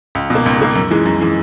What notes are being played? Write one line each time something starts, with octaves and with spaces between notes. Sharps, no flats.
C#2
B2
A#3
C#2
B2 A#3
F#2
E3 G#3
F#2
E3 G#3